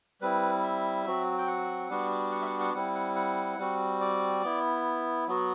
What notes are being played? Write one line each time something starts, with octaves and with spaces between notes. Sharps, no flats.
G3 C4 E4 B4
E5
F#3 C4 F#4
G5
F#5
G3 B3 D4 F#4
F#5
E5
F#5
F#5
G3 C4 E4 F#5
F#5
F#5
G3 C4 F#4
D5
B3 E4
F#3 B3 F#4